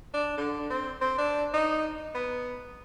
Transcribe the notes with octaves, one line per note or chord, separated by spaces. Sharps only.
D4
D3
C4
C4
D4
D#4
B3